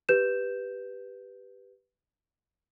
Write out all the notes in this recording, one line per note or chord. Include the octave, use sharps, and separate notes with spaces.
G4 B4 G6 E7